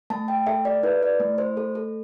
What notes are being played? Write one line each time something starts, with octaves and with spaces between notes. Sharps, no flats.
A3 A5
G5
A4 E5
D5
E4 B4
D5
A3
C5
A3 A4
A4